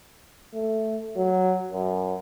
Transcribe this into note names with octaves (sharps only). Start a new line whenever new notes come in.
A3
F#3
F#2